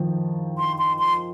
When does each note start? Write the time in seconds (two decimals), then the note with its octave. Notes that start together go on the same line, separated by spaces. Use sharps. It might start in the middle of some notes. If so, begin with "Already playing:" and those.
Already playing: D#3 F3
0.58 C6
0.78 C6
0.99 C6